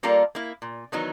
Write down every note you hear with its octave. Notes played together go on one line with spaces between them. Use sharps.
G3 A#3 F4 A4 A#4 D5
A#3 E4
A#2
D#3 E3 F#3 B3 D#4